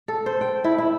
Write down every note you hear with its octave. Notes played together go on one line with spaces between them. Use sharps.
A4
C5
G5
E4
E4